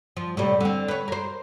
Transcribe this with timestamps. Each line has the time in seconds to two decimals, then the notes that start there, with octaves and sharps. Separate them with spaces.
0.17 F3
0.37 A2 C3 G3
0.61 D3 C4
0.88 B4 C#5
1.08 A#4 C5